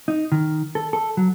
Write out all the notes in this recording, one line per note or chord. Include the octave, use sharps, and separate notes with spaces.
D#4
D#3
A4
A4
F#3